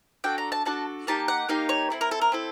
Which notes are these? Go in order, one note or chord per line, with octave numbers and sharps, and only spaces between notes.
D4 F#4 A4 G5
A#5
A5
D4 F#4 A4 A5
A#3 D#4 G4 A5
F#5
A#3 D#4 G4 F5
C#5
C4 E4 A4
A#4
A4
A#4
C4 E4 A4